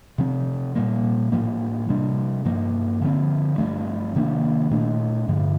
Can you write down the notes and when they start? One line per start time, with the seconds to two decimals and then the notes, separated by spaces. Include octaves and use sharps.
0.18 C3 F3 C4
0.75 A#2 G3 A#3
1.32 A2 F3 A#3
1.89 C3 G3 D4
2.45 G2 F3 A#3
3.02 D3 F3 C4
3.58 G2 F3 A3
4.15 C3 D#3 A#3 D4
4.71 A#2 A3 D4
5.28 G2 D3 F3